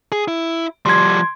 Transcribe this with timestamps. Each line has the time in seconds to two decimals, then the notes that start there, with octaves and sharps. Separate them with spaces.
0.12 G#4
0.28 E4
0.86 F3 G3 C6 G#6